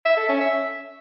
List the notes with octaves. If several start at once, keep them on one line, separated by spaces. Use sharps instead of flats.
E5
A4
C#4
E5